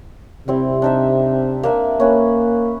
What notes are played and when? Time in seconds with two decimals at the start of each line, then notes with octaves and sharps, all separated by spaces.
0.48 C3 G3 C4 E4
0.82 D4 D#4 E5
1.63 A#3 D4 E5
2.00 A#3 C#4 B4